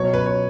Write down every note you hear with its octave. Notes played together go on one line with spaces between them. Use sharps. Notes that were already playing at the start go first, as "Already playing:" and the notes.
Already playing: B2 F#3 C#5
B4
C#5